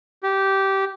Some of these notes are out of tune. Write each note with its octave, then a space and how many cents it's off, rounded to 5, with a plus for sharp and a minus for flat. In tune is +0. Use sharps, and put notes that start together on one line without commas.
G4 -15